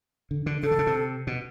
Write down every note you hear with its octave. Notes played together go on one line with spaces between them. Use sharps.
D3
D3
C#3 A4
D3
C#3
C3
B2